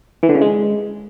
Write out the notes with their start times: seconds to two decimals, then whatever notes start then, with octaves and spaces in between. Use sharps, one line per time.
0.23 E3
0.29 D3
0.35 C#3
0.41 G#3